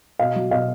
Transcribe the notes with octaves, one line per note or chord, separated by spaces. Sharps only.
B2 D#5 F5
F#3
B2 D#5 F5